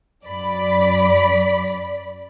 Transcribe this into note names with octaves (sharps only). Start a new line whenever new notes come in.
F#2 D5 B5